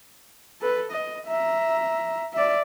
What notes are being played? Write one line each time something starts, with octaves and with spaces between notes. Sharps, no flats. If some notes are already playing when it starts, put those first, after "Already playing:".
A4 B4
D#5
E5 A#5
D5 E5